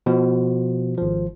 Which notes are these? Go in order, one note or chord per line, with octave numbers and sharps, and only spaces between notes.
B2 F3
G#1 F3